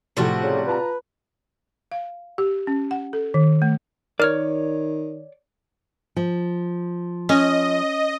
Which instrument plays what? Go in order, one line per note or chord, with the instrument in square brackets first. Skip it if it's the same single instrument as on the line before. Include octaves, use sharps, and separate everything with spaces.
[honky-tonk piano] A2 F3 A3 [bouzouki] C3 G3 F#4
[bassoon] C#3
[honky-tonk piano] F4 A5 A#5 [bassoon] B4
[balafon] F5
G4
C#4
F#5
A4
D#3
A3
[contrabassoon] D#3 [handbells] A#4 F6 [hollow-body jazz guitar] C#5 D5
[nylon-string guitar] F3
[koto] C#4 [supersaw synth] D#5